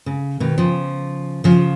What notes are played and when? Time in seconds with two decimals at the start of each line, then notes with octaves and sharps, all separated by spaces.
0.06 C#3
0.40 B2 D#3
0.58 C#3 F3
1.44 C#3 F3